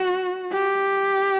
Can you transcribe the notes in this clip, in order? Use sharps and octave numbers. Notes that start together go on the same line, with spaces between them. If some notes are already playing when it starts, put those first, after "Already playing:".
Already playing: F#4
G4